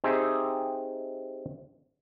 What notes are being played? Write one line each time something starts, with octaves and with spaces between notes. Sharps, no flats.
C4 D#4 G4 G#4 D#5 E5